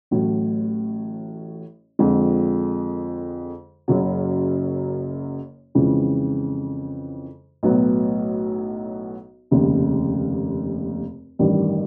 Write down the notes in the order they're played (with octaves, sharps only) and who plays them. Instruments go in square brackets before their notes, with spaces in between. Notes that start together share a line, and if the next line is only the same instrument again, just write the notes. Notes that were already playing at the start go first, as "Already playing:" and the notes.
[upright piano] A1 A2 F#3
F2 D3 F3 G#3
F#1 F#2 C#3 F#3
F2 C#3 E3 G#3
B1 A2 F#3 B3
F1 D#2 C#3
A1 G2 D#3 G3